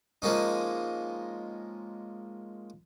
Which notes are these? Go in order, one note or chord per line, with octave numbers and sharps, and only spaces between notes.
F3 G#3 A#3 C#4 D#4